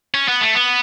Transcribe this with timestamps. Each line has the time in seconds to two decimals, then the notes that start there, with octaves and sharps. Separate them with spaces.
0.14 C#4
0.28 B3
0.41 A3
0.55 B3